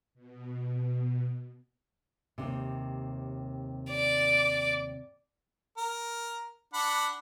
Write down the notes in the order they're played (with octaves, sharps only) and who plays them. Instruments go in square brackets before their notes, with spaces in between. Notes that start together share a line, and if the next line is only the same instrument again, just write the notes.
[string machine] B2
[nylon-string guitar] D#2 C3
[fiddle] D5 D6
[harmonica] A#4
D4 F#5 B5